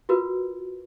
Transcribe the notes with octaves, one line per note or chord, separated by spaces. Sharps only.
F4 F#4 A#4 B4